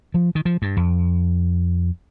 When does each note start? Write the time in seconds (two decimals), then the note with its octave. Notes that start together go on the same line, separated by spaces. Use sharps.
0.14 F3
0.35 D#3
0.45 F3
0.62 G2
0.77 F2